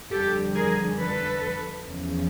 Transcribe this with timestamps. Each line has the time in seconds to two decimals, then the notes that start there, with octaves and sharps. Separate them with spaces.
0.11 F2 D3 G3 G4 A4
0.55 G#4 A#4
0.99 A4 B4
1.86 E2 C#3 F3